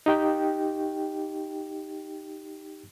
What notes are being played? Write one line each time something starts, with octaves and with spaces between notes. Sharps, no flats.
D#4 G4 G5